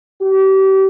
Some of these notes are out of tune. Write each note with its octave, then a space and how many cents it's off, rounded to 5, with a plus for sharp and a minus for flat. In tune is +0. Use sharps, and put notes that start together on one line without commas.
G4 -35